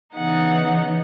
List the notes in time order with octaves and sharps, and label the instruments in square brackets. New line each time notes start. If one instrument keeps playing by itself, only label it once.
[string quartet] C#3 E3 B3 D#4 F#5